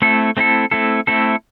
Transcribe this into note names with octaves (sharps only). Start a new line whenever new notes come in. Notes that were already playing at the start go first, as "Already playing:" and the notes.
A3 C4 E4 A4
A3 C4 E4 A4
A3 C4 E4 A4
A3 C4 E4 A4